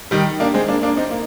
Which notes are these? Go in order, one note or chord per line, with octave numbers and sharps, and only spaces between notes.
D#3 G3
A#3 D4
G#3 C4
A#3 D4
A#3 D4
C4 D#4
A#3